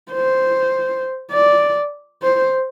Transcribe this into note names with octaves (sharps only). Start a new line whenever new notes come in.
C5
D5
C5